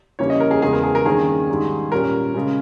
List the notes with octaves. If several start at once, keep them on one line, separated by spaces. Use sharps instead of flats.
C#3 E3 G3 A#3 C#4 C#5
D#5
A#4
G#4
E2 C#3 G#3 B3 G#4
A#4
G#4
A#4
G2 D#3 A#3 C#4 G#4
G#2 D#3 G3
A#2 G3 C#4 A#4
C#3 G#3 C#4